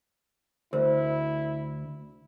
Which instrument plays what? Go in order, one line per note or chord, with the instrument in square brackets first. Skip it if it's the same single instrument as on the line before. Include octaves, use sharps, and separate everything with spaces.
[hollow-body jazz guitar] D2 [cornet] E4 [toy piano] A#4 C5